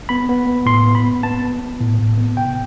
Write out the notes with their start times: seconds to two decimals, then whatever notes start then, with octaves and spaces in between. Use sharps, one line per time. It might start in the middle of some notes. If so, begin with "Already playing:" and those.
0.09 B3 B5
0.29 B3
0.47 B3
0.66 A2 C6
0.86 B3
0.95 B5
1.04 B3
1.23 B3 A5
1.42 B3
1.62 B3
1.80 A2
1.99 A2
2.18 B3
2.37 C3 G5